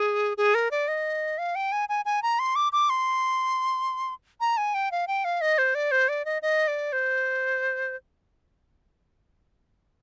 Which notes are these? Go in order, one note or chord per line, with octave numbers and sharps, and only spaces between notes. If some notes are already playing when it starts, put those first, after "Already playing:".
Already playing: G#4
G#4
A#4
D5
D#5
F5
G5
G#5
G#5
G#5
A#5
C6
D6
D6
C6
A#5
G#5
G5
F5
G5
F5
D#5
C5
D5
C5
D5
D#5
D#5
D5
C5